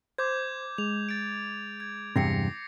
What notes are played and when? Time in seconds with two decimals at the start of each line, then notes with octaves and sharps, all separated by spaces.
0.18 C5 D6 G6 G#6
0.78 G#3 F7
1.09 A6 D7
1.80 G#6
2.16 E2 G2 C3 A#6 C7 C#7